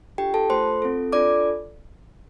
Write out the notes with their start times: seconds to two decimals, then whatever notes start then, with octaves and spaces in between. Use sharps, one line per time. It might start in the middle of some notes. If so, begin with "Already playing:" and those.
0.18 D4 F4 G4 A4 G5
0.34 A4 A5
0.50 A3 F4 A4 C5 C6
0.82 C4 F4 A4
1.12 D4 F4 A4 D5 D6